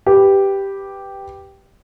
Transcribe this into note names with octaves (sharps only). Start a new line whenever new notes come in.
G4 B4